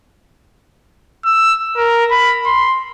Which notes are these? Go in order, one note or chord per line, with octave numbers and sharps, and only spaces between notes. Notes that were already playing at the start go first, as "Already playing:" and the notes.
E6
A#4
B5
C6